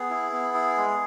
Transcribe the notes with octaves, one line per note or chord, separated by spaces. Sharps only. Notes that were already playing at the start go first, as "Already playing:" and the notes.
Already playing: B3 G#4
E4
B3
E4
G#3